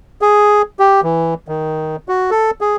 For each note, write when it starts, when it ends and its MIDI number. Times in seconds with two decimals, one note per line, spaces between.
0.22 0.62 68
0.79 1.01 67
1.03 1.34 52
1.48 1.96 51
2.09 2.30 66
2.31 2.51 69
2.61 2.77 68